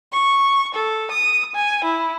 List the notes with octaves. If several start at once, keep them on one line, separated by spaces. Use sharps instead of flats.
C#6
A4
D#6
G#5
E4